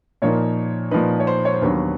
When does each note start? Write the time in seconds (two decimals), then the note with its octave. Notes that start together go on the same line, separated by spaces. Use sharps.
0.22 A#2 F3 A#3 D#4 C#5
0.91 A#2 F3 A#3 D#4 B4
1.20 C#5
1.27 C5
1.45 C#5
1.54 C5
1.62 D#2 D3 F#3 B3 B4